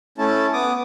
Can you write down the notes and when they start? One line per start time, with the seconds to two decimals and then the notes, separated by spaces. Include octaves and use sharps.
0.18 A3 C#4 E4 A5
0.53 B3 D6 D#6